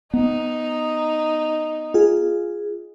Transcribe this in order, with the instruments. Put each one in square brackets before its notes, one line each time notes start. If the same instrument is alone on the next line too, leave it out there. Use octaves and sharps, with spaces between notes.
[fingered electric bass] B3 [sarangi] D#4
[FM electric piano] F4 G#4